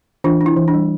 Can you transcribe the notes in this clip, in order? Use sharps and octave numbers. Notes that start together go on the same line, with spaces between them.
E3 D4 F4
D4
E4
E3
D4
G3